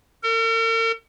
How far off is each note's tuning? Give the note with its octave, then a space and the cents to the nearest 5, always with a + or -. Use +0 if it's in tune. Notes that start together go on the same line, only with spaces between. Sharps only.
A#4 -45